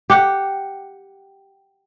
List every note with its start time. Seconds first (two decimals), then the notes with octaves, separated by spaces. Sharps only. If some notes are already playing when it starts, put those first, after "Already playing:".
0.10 G4 F#5